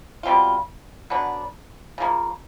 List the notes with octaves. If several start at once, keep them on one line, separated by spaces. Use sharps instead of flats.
B2 G3 C4 F4
D3 F#3 B3 D4
C#3 F3 A#3